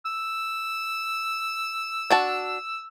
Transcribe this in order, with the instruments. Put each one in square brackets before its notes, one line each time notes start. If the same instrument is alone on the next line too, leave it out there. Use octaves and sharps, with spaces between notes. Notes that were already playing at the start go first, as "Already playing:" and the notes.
[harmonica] E6
[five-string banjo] D4 F#4 A5